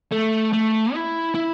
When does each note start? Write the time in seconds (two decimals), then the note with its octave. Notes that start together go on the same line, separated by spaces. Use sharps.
0.11 A3
0.52 A3
0.94 E4
1.34 E4